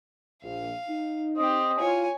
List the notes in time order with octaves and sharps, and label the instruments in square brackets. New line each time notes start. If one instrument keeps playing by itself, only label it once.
[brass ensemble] A#1 [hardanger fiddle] F5
[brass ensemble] D#4
[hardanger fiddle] C4 G4 [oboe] D#5
[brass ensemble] E4 F4 [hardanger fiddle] C#5 G#5